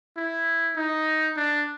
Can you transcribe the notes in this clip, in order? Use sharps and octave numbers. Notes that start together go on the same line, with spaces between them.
E4
D#4
D4